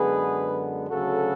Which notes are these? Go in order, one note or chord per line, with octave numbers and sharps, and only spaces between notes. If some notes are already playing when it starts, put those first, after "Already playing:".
Already playing: F#2 D3 G#3 B3 G#4 B4
D2 C#3 F#3 F#4 A4